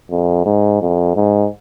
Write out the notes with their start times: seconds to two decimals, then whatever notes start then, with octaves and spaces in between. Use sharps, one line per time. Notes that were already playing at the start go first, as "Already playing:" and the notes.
0.10 F2
0.46 G#2
0.81 F2
1.16 G#2